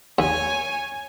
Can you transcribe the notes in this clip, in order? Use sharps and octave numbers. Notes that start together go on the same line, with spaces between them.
D#2 C#5 G#5